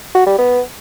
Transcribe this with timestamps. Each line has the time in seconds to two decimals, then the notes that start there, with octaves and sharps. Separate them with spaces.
0.15 F#4
0.27 G3
0.38 B3